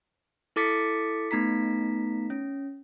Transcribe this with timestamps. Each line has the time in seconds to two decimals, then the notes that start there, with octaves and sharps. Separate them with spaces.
0.56 E4 A4 D6 A6 B6 C#7
1.31 A3 B3 D#4 A#5 B6
2.30 C#4